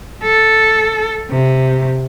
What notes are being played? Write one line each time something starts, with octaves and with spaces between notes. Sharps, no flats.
A4
C3